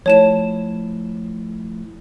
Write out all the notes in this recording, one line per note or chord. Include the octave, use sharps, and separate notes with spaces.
F3 A3 E4 C#5 A5 E7